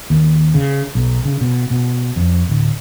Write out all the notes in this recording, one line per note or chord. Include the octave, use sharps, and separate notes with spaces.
D#2
C#3
B1
C#3
B2
B2
F2
D1